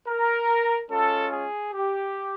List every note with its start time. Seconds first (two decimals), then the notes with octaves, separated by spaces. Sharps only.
0.08 A#4
0.90 G#3 C#4 F4 A4
1.31 G#4
1.73 G4